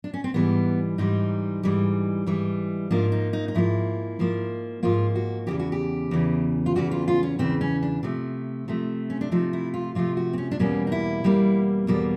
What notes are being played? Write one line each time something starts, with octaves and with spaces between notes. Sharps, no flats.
D4
C#4
C4
G#2 E3 G3 B3
G#2 E3 G3 D#4
G#2 E3 G3
G#2 E3 G3
G#2 F3 A#3 D4
D#4
D#4
D#4
G#2 F3 A#3 E4
G#2 F3 A#3
G#2 F3 A#3 F4
F#4
E2 C#3 E3 G4
F#4
G4
E2 C#3 E3
F4
E2 C#3 E3 F#4
F4
F4
C#4
E2 C#3 E3 C4
C#4
D4
C3 F3 A3
C3 F3 A3
C#4
D4
C3 F3 A3 D#4
E4
F4
C3 F3 A3 F4
F#4
C4
C#4
D4
E2 B2 G3 A#3 C#4
D#4
E4
E2 B2 G3 A#3
E2 B2 G3 A#3 A4